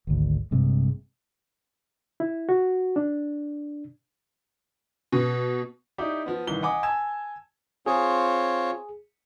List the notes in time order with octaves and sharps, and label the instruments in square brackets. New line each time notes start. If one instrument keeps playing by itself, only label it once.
[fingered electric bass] G#1 D2
A#1 G2 C3 G#3
[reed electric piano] E4
F#4
D4
[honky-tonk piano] B2
[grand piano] D#4 E4 G4 D5
F3 B3
C2 D#3 E3 G7
D#5 F#5 G#5 B5 D6
G#5 A5 E6 G#6 E7
[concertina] C4 F4 C#5 [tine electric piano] G#4